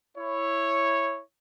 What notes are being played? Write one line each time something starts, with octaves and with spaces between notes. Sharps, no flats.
E4 C#5